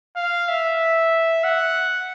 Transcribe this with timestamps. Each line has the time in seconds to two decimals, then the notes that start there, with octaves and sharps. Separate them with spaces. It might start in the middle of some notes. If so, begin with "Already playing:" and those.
0.16 F5
0.48 E5
1.43 F#5